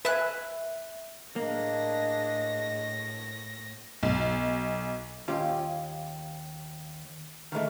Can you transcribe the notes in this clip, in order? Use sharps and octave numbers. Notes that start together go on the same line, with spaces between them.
B4 E5 G#5 F#6
A2 A#3 D4 G#4 D#5 A#6
B1
D#2 C#4 F4 G4
D#3 E3 G#3 A3